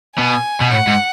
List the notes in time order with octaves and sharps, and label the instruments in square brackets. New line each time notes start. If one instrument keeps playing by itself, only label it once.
[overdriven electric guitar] B2 [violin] G#5
[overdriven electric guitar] B2
[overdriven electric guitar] A2 [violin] F#5
[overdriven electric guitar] G#2